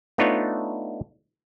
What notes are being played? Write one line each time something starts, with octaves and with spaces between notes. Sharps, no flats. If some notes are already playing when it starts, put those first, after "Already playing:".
A3 B3 D4 D#4 F4 C#5